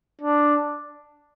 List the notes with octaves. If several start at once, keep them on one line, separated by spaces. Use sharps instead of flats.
D4